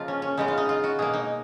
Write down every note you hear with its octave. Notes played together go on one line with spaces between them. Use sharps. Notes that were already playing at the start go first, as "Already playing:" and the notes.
Already playing: C#3 F3 A#3 D#4 F4
C#4
C#4
C#3 G#3 B3 D#4
F4
D#4
F4
F#4
B2 A#3 G#4
D#4